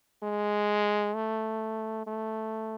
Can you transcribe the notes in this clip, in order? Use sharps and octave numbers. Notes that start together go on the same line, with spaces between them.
G#3
A3
A3